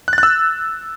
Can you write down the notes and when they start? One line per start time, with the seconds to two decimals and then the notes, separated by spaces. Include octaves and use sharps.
0.08 F#6
0.13 A6
0.18 F#6
0.23 E6